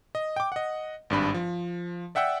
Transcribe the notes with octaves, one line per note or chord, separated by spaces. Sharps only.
D#5
G5 D6
D#5 F#5
G#1 G2 D4 B5
F3
D5 E5 F#5 G5 E6